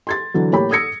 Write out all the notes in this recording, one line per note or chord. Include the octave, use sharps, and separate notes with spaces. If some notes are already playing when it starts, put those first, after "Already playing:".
C6 G#6 A6
D3 E3 F#3
A2 A#3 G4 C#5 B5
D#6 E6 G#6 A#6 C#7